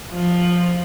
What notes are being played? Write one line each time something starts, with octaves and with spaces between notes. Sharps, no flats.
F3